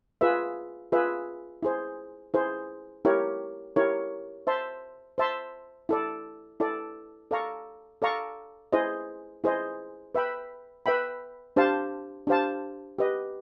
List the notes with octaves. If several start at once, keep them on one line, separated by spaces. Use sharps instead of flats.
F4 G#4 B4 E5
F4 G#4 B4 E5
E4 G#4 C5
E4 G#4 C5
E4 G4 A#4 C#5
E4 G4 A#4 C#5
C5 E5 A5 C6
C5 E5 A5 C6
E4 A4 D5
E4 A4 D5
A4 D5 F5 A#5 C#6
A4 D5 F5 A#5 C#6
E4 G#4 C5 D#5
E4 G#4 C5 D#5
B4 E5 G5 B5
B4 E5 G5 B5
D4 G4 C5 F5 A5
D4 G4 C5 F5 A5
G4 B4 D#5